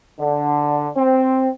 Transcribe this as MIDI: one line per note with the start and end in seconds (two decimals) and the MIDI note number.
0.19 0.87 50
0.97 1.48 60